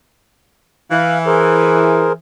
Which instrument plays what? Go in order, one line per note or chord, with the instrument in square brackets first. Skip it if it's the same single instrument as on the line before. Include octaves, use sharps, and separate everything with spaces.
[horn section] E3 [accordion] F5 F#6
[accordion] G#4 A#4 C5